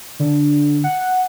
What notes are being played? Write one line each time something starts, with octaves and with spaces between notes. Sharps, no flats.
D3
F#5